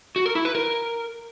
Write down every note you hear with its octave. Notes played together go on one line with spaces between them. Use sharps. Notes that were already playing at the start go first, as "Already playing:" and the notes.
F#4
A#4
E4
B4
A#4